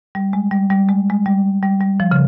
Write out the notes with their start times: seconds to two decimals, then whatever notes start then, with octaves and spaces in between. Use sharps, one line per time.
0.15 G3
0.33 G#3
0.51 G3
0.70 G3
0.88 G#3
1.10 G#3
1.26 G3
1.63 G3
1.80 G3
2.00 F3
2.11 C#3